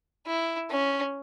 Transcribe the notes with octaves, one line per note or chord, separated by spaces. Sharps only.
E4
C#4